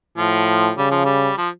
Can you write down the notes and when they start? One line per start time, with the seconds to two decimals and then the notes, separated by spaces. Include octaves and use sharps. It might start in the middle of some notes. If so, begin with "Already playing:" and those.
0.18 A2 F3
0.77 C#3 G3
0.91 F3
1.05 G3
1.38 F3